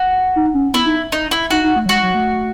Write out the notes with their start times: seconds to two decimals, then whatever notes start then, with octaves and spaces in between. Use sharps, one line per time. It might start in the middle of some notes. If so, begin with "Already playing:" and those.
Already playing: F#4
0.36 D#4
0.54 C#4
0.74 B3 E4
0.86 D#4
1.12 D#4
1.31 E4
1.51 D#4 F#4
1.64 D#4
1.76 A3
1.86 F#3
1.89 G#3 F#4
2.03 F#3
2.15 A3